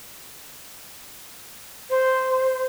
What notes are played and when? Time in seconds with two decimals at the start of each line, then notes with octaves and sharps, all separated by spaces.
1.90 C5